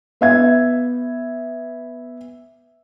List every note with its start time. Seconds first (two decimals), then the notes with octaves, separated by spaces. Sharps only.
0.21 B3 E5 G#6